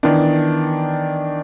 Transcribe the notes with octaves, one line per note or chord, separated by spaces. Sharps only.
D#3 E3 B3 D4